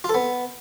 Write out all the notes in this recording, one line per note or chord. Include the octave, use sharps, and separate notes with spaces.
F4
A4
B3